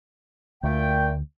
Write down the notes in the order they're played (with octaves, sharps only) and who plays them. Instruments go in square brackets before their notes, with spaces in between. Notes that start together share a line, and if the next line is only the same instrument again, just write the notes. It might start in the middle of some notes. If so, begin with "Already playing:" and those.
[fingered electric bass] D2 [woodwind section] A#2 A3 G5